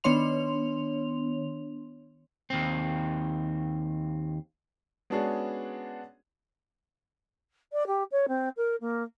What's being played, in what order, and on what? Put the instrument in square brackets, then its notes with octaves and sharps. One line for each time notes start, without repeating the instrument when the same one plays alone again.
[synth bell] D#3 B3 D4 C#5 C6 F7
[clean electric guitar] D#2 C4
[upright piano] G#3 B3 C#4 D4 F#4 G#4
[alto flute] D5
G4
C#5
C4
A#4
A#3